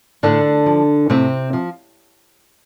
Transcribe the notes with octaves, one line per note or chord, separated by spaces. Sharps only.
A2 D3 D4
F3
A2 C3 C4
F3